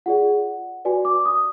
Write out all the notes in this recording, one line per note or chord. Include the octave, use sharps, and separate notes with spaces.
F4 G#4 D5 F#5
F#4 B4 D5 G#5
D6
D#6